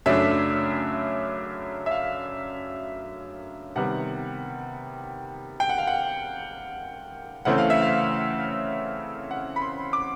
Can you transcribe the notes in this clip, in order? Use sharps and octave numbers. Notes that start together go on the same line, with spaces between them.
F#2 C#3 F#3 A3 D4 E5
E5
F5
C3 D#3 G3 B3 F#5
G5
F#5
F5
F#5
C#3 E3 A3 C4 F#5
F5
E5
F5
F#5
B5
C6
D6